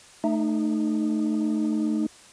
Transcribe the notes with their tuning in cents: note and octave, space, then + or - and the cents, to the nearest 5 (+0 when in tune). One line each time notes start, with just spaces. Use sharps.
A3 +0 D#4 -20